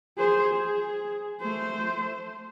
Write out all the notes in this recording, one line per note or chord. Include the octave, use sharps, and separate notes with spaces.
G#4 C5
G#4
A3 C5